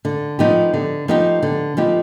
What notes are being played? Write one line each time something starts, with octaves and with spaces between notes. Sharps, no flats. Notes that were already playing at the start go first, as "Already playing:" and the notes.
D3
F3 B3 D#4 G4
D3
F3 B3 D#4 G4
D3
F3 B3 D#4 G4